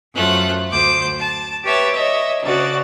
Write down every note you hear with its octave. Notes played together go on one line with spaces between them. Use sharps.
F#2 F3 A3 F#6
D2 C5 D6 G6
A5
G4 B4 C#5 E5 A5
C#5 D#5 E5
D2 C#3 F#4 D5 A6